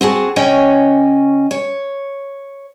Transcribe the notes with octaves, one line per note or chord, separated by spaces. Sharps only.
C4 F#4 G#4 A5
C#3 C#4 C#5 D#5 G5 G#5
C#5